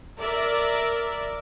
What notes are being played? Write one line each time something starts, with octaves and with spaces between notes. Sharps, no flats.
A#4 D5 E5